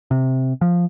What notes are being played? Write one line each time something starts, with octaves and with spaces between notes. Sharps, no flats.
C3
F3